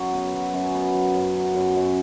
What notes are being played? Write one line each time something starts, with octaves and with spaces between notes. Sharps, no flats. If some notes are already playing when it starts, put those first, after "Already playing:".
Already playing: F#2 F#3
B3
F#3
F#2
B3
F#3
F#2
F#3
F#2
F#2